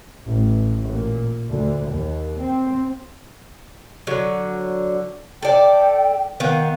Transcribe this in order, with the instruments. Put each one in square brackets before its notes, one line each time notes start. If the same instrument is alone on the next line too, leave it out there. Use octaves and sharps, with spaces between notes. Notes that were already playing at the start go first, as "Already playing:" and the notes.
[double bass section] A1
A#2
D2
D#2
C4
[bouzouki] D3 F#3
[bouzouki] A4 D5 [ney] G5
[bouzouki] D#3 B3 [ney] F5